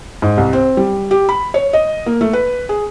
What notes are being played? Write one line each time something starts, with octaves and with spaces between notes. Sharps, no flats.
G#2
C2
C4
G3
G4
B5
C#5
D#5
A#3
A3
B4
G#4